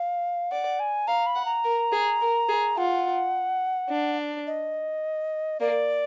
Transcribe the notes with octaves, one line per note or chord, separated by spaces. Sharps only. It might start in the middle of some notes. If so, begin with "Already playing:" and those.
Already playing: F5
D5 F#5
G#5
F5 A#5
B5
F#5
A#5
A#4
G#4
A#4
G#4
F4 F#5
D4
D#5
A#3 D5